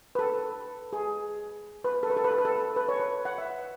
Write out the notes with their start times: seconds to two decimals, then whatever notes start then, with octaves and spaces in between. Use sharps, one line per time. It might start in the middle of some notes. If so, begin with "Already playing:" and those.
0.15 B4
0.19 A4
0.93 G#4
1.84 B4
2.03 A4
2.10 B4
2.17 A4
2.24 B4
2.31 A4
2.38 B4
2.45 A4
2.76 B4
2.89 C#5
3.00 B4
3.25 F#5
3.38 E5